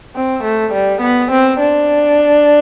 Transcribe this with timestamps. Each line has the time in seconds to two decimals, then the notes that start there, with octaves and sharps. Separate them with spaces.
0.15 C4
0.44 A3
0.73 G3
1.02 B3
1.32 C4
1.60 D4